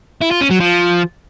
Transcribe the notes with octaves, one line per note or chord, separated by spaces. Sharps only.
E4
F4
C#4
F#3
F3